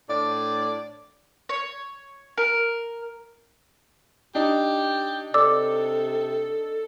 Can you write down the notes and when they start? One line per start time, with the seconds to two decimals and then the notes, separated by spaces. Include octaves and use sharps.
0.09 A2 D4 D5
1.49 C#5
2.38 A#4
4.35 D4 D#4 G4
5.34 C3 A4 D5 D6 E6